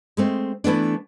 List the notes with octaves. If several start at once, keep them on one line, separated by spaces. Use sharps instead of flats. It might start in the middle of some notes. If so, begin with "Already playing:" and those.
G#3 A3 C4
E3 A3 B3 D4